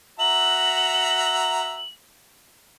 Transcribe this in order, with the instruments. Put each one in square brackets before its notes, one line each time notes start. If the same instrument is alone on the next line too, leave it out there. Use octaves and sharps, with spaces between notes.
[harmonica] F#4 E5 A#5 [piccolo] F#7